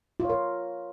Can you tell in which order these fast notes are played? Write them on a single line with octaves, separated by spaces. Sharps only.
F4 C#5 A#4